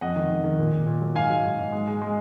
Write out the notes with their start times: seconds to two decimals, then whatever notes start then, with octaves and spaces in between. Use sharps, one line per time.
0.01 F2 D#5 F#5
0.16 D#3
0.30 D#3
0.44 D#3
0.58 A#2
0.73 A#2
0.86 A#2
1.01 F#3
1.15 G#2 F5 G#5
1.30 F#3
1.44 G#2
1.59 G#2
1.72 G#3
1.87 G#3
2.02 G#3